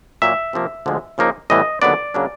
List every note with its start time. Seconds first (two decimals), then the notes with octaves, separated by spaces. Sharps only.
0.22 A#2 F#3 A#3 E5
0.53 C3 F3 A#3
0.86 D2 D3 F3 G#3
1.18 C#3 F3 A#3 D#4
1.50 A2 E3 G3 B3 D#5
1.82 D#2 D3 F#3 B3 D4 D5
2.14 C#3 F#3 A#3 D4